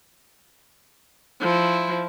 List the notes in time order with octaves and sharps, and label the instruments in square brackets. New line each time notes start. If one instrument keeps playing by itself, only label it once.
[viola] F3 E4